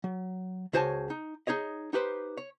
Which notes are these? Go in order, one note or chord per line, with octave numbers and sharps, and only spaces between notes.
F#3
C#2 F#4 C5 C#5 G#5 A5
D#4
D#4 G#4 C#5 D#5
D#4 G4 B4 C5
C#5